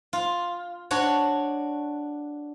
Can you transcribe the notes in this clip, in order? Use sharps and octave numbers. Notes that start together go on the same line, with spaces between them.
F4
D4 F#4 C#5